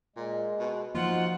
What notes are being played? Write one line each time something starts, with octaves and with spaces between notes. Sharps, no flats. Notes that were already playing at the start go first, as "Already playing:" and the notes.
A#2 G#3
B2
F3 F#3 A#3 D#4 F4 F#4 C5 F#5